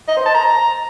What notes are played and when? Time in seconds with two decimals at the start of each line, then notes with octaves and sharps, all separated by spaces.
0.08 D#5
0.17 C5
0.25 A5
0.34 A#5